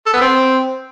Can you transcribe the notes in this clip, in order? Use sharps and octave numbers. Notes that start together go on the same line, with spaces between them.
A4
B3
C4